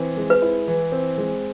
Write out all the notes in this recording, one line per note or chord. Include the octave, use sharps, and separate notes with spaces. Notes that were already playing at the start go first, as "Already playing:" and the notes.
Already playing: E3 C4
G#3
B4
E4
E3
C4
G#3